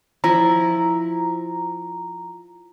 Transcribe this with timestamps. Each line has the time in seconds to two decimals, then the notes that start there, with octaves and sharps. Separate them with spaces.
0.24 F3 E4 A#5